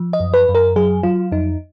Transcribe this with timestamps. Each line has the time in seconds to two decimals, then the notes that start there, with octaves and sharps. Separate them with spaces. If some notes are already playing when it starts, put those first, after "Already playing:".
Already playing: F3
0.13 D#5
0.20 F#2
0.34 B4
0.49 F#2
0.55 A#4
0.76 F#3 G#4
1.03 F#3 F4
1.32 F2 D#4